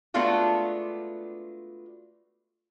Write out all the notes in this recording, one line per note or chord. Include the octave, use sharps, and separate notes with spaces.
G#3 A3 B3 D4 F4 F#4